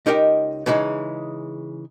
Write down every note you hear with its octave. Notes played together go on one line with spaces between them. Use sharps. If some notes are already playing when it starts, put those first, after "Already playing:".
C#2 D#4 G4 A#4 D#5 G5
C#3 E3 G#3 C#4 D#4